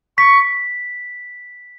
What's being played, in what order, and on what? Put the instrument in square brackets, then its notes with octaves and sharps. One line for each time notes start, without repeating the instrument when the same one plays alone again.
[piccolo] C#6 [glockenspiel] B6